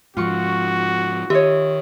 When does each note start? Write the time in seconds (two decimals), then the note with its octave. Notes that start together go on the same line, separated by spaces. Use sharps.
0.17 G#2 F3 F4 F#4 C#6
1.30 D#3 G4 C#5 D#5 E5